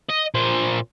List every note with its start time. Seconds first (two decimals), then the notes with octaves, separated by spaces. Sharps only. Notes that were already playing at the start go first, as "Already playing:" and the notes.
0.10 D#5
0.35 A#2 C5